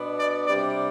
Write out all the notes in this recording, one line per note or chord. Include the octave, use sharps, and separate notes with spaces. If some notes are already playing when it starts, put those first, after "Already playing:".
Already playing: B2 B3 D4
D5
C3 G3 D4 D5